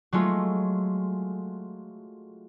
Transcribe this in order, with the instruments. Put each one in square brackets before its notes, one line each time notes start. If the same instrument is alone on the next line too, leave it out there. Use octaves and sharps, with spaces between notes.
[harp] F#3 G#3 A3 F4